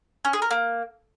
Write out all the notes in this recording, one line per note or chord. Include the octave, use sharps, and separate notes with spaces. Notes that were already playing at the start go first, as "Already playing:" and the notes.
C#4
G#4
A#4
A#3